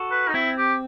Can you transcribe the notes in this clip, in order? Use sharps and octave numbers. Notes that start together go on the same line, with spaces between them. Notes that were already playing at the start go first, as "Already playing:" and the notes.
Already playing: F#4 A4
B4
D#4
C4 E4
G4